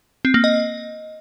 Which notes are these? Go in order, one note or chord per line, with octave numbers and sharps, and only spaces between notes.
C4
A#3
D#5